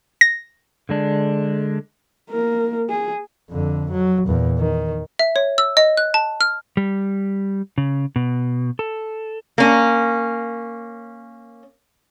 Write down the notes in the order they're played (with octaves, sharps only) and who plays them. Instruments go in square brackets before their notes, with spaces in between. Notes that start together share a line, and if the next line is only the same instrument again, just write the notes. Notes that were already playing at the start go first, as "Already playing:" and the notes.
[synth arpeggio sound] A#6
[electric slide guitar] D3 G#3 D4
[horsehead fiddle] A#3 A#4
G#4
[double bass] F2 D3
F#3
E2 A#2
D#3
[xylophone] E5
C#5
E6
D#5
F#6
A5
F6
[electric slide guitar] G3
C#3
B2
A4
[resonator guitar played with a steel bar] A#3 C#4